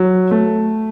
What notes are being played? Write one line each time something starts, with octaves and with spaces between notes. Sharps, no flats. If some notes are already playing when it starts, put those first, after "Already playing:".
Already playing: F#3
A3